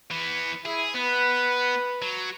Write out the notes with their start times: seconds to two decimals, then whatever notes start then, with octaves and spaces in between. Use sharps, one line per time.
0.11 E3 B3
0.65 E4 G#4
0.94 B3 B4
2.02 F#3